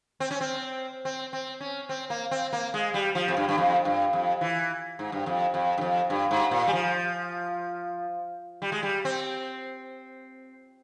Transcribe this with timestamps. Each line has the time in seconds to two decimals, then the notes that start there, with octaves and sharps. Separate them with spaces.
0.20 C4
0.31 C#4
0.41 C4
1.05 C4
1.33 C4
1.60 C#4
1.89 C4
2.10 A#3
2.31 C4
2.53 A#3
2.74 G#3
2.94 G3
3.15 F3
3.28 F2
3.37 G2
3.49 G2
3.58 F2
3.85 G2
4.13 F2
4.41 E3
4.99 G#2
5.12 G2
5.26 F2
5.54 F2
5.78 G2
5.81 F2
6.10 G2
6.31 G#2
6.51 A#2
6.67 G3
6.73 F3
8.62 G3
8.72 G#3
8.83 G3
9.05 C4